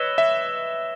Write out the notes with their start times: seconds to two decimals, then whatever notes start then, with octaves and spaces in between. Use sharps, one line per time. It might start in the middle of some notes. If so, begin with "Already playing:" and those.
Already playing: B4 C#5 D#5 E6 A#6 E7 G7
0.18 E5